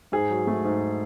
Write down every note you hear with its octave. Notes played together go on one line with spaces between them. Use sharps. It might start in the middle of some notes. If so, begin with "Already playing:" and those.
G#2 G#4
F#3
A3
G#2